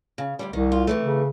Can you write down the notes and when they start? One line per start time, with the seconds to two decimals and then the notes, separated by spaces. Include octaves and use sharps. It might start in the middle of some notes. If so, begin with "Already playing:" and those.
0.18 C#3
0.39 D2 G#2 G3
0.53 C2 D#3
0.72 F4
0.87 C3 E3 A3
1.02 C#3